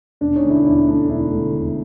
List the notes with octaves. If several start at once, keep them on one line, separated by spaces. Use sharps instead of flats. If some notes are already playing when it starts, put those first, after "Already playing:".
E1 D4
C#4 D#4
D2 D3
D4 E4
E1 D4 E4
D2 D3 D4
E1 D4 E4
D2 D3
E1